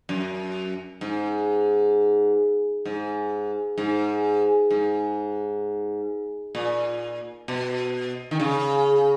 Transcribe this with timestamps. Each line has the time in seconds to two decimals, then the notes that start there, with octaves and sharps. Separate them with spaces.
0.09 F#2
1.01 G#2
2.85 G#2
3.78 G#2
4.71 G#2
6.55 A#2
7.48 B2
8.31 D#3
8.40 C#3